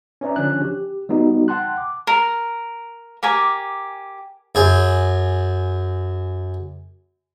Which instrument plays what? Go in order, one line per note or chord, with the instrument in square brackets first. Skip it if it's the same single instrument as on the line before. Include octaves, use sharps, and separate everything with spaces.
[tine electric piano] C#4 B4 D5 E5 A#5
D3 F3 C#4 D4 F#6
G4
G3 B3 D#4 F#4
F#5 G5 A5 C6 F#6
D6
[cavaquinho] A#4
G4 A#4 G#5 D6
[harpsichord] F#2 G#4